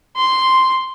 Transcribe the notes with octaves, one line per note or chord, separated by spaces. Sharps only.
C6